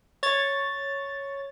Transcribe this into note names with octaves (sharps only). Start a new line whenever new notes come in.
C#5 A6